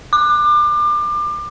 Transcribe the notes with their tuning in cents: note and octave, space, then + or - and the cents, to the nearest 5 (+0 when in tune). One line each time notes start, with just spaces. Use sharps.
D6 +30